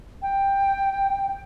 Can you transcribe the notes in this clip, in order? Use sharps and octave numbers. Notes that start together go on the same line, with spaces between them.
G5